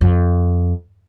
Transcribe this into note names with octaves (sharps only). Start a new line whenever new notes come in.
F2